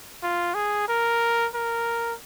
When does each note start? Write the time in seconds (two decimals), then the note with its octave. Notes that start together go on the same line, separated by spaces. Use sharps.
0.23 F4
0.55 G#4
0.88 A#4
1.55 A#4